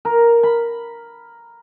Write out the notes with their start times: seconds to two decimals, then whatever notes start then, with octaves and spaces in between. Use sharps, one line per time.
0.05 A#4
0.43 B5